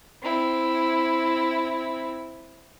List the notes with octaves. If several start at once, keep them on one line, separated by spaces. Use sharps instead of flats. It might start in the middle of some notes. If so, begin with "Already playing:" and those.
C4 E4